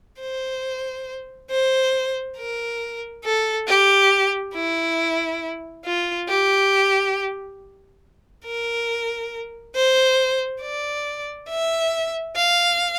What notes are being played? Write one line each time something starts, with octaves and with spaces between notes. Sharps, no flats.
C5
C5
A#4
A4
G4
E4
F4
G4
A#4
C5
D5
E5
F5